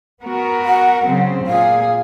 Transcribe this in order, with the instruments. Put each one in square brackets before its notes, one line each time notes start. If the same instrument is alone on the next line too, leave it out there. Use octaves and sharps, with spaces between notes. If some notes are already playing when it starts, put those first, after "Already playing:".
[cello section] B3 F#4 A#4
[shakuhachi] F#5
[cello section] C#3 F#3 C4
[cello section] A#2 G#4 [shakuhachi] F5